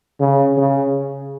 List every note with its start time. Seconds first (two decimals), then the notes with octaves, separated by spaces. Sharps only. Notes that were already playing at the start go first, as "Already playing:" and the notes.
0.20 C#3
0.57 C#3